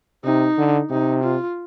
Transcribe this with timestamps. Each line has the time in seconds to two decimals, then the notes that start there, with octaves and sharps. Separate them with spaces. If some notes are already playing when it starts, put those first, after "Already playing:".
0.24 C3 D#4
0.58 D3
0.90 C3 D#4
1.23 F4